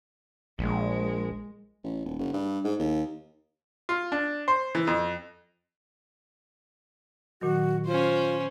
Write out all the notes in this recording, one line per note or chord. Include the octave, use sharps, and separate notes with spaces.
A#1 G#3
A1
D#1
F#1
G2
G#2
D#2
F4
D4
C5
E3
F2
A#2 D#3 F#3 F#4
C#4 F4 C5